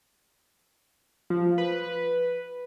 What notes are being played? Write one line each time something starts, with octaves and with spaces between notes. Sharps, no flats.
F3
B4